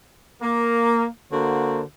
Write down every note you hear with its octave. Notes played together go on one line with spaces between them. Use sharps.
A#3
D3 A#3 F#4 C5